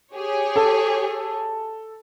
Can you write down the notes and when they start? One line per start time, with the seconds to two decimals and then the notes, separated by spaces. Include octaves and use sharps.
0.15 G4 G#4 C#5
0.56 A4